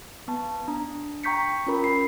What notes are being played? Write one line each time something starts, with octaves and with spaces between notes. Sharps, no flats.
B3 A5
D4 A#5
G5 A#5 C#6 G6 B6 C#7
C#4 F4 A#4 B5
B5 C7